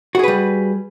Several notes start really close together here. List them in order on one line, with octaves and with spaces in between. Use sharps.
F#4 G#4 B4 G3